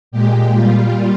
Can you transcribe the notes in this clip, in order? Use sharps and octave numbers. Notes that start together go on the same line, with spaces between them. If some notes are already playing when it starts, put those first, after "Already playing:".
A#2 G#3 G4
A#2 G3 F4